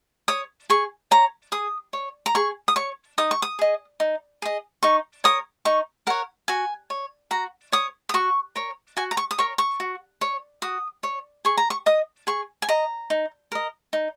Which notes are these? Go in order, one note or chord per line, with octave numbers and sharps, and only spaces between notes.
C#5 D#6
G#4 C#6
C#5 A#5
G#4 D#6
C#5
A#5
G#4 C#6
D#6
C#5 C#6
D#4 D#6
C#6
D#6
G#4 D#5
D#4
G#4 D#5
D#4 C#6
A#4 C#5 D#6
D#4 C#6
A#4 C#5 F#5
F#4 G#5
C#5
F#4 A#5
C#5 D#6
D#6
F#4 C#6
A#4 C#5
F#4 G#5
A#5
C#6
D#6
A#4 C#5 C#6
C#6
F#4
C#5
F#4 D#6
C#5
G#4 C#6
A#5
C#6
D#5 D#6
G#4 C#6
G#5
D#5 A#5
D#4
A#4 D#5
D#4